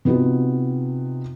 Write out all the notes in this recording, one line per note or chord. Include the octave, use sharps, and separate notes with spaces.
C3 B3 D#4 F4 F#4